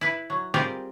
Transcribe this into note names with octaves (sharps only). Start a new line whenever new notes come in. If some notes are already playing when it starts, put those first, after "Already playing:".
E4 B4
F#3
G3 C4 F4 G4 G#4 A#4